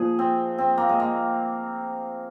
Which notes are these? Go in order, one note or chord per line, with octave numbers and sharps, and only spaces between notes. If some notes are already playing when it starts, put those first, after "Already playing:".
Already playing: A#2 F3 G#4
C4
C4
A#3
G#3
A#3